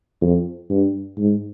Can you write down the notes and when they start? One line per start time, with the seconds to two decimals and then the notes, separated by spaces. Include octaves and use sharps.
0.22 F2
0.70 G2
1.18 G#2